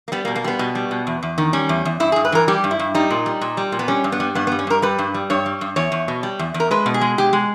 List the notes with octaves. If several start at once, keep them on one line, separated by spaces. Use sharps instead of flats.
A#3
G3 B3
A#3
B2
A#3
G3 B3
B2
G3
B2
E2
E2
D#3
G3 C#4
E2
E2
G2 E4
G#4
G2
B4
E3 A#4
G3 G4
G2
E4
G2
G3 D#4
A#2
G3
A#2
G3
A#2
B3
G3 C#4
G2
B3
G3
G2 B3
B3
G3
C#4
G2 A#4
G3 B4
G2
G3
G2 C#5
G3
G2
E2 C#5
E2
B2
G3
E2
E2
A#4
G#3 B4
B2
G#4
G#3
B2 G4
G#3